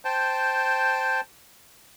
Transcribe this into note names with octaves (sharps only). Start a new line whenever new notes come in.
C5 G5 A5